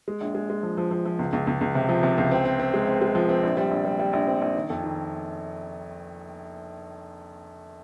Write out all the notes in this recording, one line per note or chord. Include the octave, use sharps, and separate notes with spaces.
G#3
A#1
G#3
G#3
F3
F3
F3
F3
C#2
C#2
C#2
C#2
C3
F3
C3
C#2
C4
C4
C4
G#3
C4
G#3
F3
C4
A#1
G3
A#1
G3
G3
A#1
C4
A#1
D#3
F2
D#3